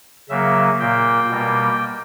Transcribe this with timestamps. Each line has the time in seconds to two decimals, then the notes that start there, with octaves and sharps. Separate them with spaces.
0.29 C#3 F#3 A#3 E5
0.80 A#2 A#3 G5
1.29 B2 G3 A#3